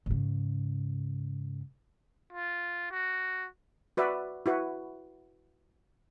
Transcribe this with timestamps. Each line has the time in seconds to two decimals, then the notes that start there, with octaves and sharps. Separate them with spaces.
0.06 G#2 C#3
2.32 F4
2.91 F#4
3.97 F#4 B4 D5 E5
4.46 E4 F#4 B4